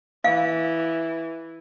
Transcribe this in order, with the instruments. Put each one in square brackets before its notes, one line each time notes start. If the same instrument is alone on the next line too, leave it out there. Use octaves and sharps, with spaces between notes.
[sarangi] E3 [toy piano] F5